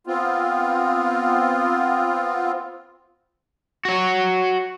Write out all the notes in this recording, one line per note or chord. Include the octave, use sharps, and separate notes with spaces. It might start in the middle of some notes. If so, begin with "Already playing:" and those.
B3 C4 F4
F#4 C#5